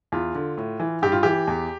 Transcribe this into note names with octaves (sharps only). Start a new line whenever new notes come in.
E2 F4
D3
A2
E3
G2 G4
F4
E3 G4
E2